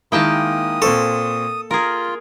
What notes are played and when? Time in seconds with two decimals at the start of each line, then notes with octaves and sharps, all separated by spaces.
0.12 D#3 G#3 A#3 E4 G5 A5 D#6
0.82 A#2 C4 A4 C#6
1.71 F4 G#4 A#4 A#5